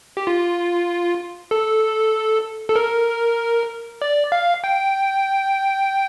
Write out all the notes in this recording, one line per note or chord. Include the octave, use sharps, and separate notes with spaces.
G4
F4
A4
A4
A#4
D5
F5
G5